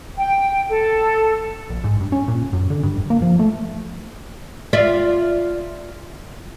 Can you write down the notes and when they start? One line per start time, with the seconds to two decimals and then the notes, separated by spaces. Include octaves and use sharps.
0.18 G5
0.70 A4
1.70 A#1
1.84 G#2
2.01 G2
2.12 C#4
2.28 A#2
2.53 F#2
2.70 D3
2.83 G2
2.97 D#1
3.10 A#3
3.22 F3
3.39 A3
4.73 F4 D5 E5